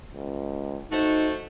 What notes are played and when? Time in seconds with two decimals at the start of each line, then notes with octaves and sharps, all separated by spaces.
0.13 C#2
0.91 A3 D#4 F#4 C5